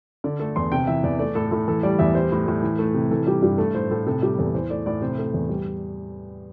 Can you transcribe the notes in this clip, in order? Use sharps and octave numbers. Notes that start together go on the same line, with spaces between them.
D3 D5
A3 A4
E2 C6
C3 G5
E3 E5
E2 D5
A3 D5
A2 A4
A2 A4
E3 A4
G3 D5
E2 E5
G3 C5
A2
A2
E3
A3
C3
E3 A4
G3 G4
G2 G4
A3 A4
A2 C5
A2 A4
C3 A4
G3 G4
E2 A4
E3 C5
A3 D5
A2 D5
C3 C5
A3
E2
G3